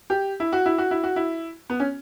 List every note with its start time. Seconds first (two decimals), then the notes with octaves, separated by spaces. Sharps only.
0.10 G4
0.40 E4
0.53 F#4
0.66 E4
0.78 F#4
0.91 E4
1.03 F#4
1.16 E4
1.70 B3
1.80 C#4